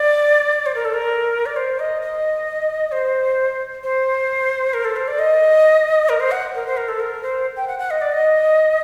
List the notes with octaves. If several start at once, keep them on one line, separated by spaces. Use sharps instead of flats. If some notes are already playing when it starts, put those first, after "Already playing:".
Already playing: D5
C5
A#4
A4
A#4
D5
C5
D#5
D#5
C5
C5
A#4
A4
C5
D5
D#5
A#4
C5
F#5
A#4
C5
A#4
A4
A#4
C5
G5
F#5
F#5
D#5
D5
D#5